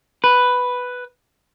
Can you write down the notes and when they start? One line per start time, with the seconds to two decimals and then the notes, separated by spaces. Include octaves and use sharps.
0.24 B4